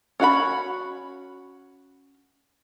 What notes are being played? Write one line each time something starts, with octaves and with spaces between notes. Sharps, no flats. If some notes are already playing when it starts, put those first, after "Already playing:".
C#4 F#4 F5 B5